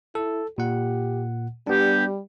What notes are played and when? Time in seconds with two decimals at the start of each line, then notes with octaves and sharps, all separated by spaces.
0.15 E4 A4
0.58 A#2 G4 F#5
1.67 G3 B3 D4 G4